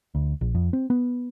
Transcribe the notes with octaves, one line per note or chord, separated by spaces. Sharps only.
D2
A#1
F2
C4
B3